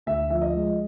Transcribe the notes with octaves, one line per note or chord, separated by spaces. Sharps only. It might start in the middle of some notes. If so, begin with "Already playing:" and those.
D2 E5
F3 E5
D#5
G#3